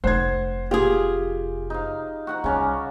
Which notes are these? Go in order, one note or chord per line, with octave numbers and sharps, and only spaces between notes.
F1 C3 C5 F#5 G#6
F4 G4 G#4
F5
D#4 F5
F#4 F#5 A#5
C2 C#3 C#4 D5